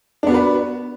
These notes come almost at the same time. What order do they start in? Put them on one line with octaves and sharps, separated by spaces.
D4 B3 F#4 B4